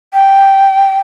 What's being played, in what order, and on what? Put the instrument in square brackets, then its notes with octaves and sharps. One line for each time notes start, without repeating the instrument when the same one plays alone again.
[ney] G5